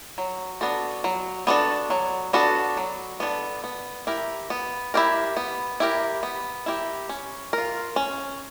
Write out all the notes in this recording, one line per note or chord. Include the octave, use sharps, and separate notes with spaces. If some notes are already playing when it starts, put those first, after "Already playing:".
F#3
B3 D4 F#4 A4
F#3
B3 D4 F#4 A4
F#3
B3 D4 F#4 A4
F#3
B3 D4 F#4 A4
B3
E4 G4 A#4
B3
E4 G4 A#4
B3
E4 G4 A#4
B3
E4 G4 A#4
C#4
A#4
F4
C#4